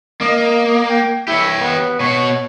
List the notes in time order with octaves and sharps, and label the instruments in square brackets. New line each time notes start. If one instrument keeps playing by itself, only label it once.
[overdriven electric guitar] A#3 [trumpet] D#5
[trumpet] G5
[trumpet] E4 [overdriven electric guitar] G4 C#5
[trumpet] B3
[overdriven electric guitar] B2 F#4 [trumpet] C#5